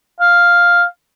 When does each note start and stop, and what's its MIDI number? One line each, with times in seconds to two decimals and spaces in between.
0.21 0.85 77